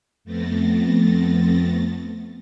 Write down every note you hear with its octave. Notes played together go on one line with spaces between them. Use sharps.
F2 A3 B3 C4 A6 A#6